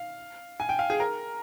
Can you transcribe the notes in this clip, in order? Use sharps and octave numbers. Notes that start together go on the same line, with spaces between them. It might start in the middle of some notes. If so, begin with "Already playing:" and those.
Already playing: F5
G#5
G5
F5
G#4
A#4